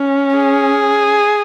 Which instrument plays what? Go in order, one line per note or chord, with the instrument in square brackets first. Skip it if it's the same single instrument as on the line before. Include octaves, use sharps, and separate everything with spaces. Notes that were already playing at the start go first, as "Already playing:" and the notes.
Already playing: [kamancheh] C#4
[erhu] G#4